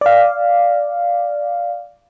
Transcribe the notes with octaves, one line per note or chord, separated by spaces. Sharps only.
D5 F5